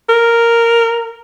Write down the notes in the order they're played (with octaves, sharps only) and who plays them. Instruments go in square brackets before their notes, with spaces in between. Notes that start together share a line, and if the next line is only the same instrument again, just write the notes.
[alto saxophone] A#4